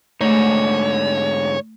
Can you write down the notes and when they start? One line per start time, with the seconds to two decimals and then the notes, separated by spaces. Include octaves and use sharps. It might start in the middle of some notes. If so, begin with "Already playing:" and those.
0.21 G#2 D3 A3 D#4 C#5